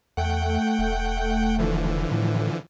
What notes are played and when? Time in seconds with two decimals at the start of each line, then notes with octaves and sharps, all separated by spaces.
0.17 E2 A3 F#5 G5 G6
0.79 E1
1.59 D3 E3 F3
2.11 A2